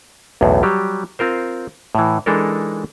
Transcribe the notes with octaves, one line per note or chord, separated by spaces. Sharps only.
B1 E2 A2
F#3 G3 G4
C4 F4 A#4 C5
A2 E3
E3 G#3 D4 D#4 A4 A#4